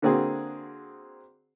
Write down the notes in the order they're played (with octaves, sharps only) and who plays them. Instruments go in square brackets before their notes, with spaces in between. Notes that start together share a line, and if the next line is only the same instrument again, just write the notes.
[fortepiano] D3 A#3 C4 F#4 G#4